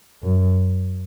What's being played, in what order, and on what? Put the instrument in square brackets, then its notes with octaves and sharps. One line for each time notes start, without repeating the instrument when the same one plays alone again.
[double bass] F#2